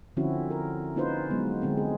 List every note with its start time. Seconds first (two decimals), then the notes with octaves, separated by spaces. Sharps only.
0.17 D3 F3 C4 C#4 E4 F#4
0.51 A#4
0.96 A#3 C#4 D#4 F4 B4 C5
1.30 F#3 G#3 B3
1.62 D3 G#3 C4
1.77 G#4